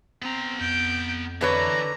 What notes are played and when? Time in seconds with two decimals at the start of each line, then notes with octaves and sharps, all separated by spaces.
0.22 B3 C4 A#5
0.61 F2 G6 D7
1.41 D3 E3 B4 C#5 A#5